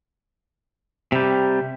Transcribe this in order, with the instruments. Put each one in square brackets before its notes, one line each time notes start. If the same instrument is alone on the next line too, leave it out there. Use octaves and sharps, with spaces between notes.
[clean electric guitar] C3 G3